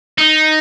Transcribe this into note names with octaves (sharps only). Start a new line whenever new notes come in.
D#4